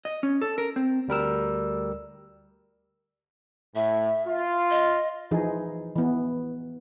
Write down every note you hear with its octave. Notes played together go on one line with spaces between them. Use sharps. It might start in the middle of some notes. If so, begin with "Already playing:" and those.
D#5
C#4
A4
A#4
C4
D2 G3 A#4 E6
A2 E5
F4
D#5
E3 F3 D#4 G#4
E3 B3